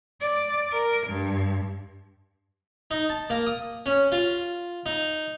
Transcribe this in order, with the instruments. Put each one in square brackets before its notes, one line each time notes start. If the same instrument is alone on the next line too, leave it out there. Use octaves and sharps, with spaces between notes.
[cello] D5
A#4
G2
[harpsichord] D#4
A5
A#3
D#6
C#4
F4
D#4